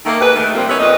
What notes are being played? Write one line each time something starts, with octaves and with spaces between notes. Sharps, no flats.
D#3 A3 A#3
D#2 G#4 B4
D#3 A3
C3 F3 G3 A#3 C4
B3 C#4 D#4 C#5 E5
F2 A#2 B4 D#5